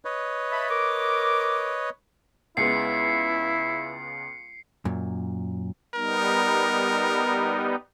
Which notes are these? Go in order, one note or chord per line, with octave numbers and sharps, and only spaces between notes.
B4 C#5 D#5
E5 A5 B5
A#4 D6
C#2 G#3 B3 E4 C7 C#7
F#2 A#2
G3 B3 D#4 A#4